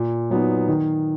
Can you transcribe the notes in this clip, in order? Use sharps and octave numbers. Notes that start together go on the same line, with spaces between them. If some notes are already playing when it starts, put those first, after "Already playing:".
Already playing: A#2
F#3 B3 D#4
D#3